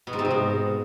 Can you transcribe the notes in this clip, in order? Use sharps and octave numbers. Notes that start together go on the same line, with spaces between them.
B2
G#2
C3
G#2
B2